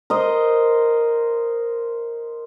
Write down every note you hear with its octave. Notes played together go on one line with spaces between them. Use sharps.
A#4 C5 D#5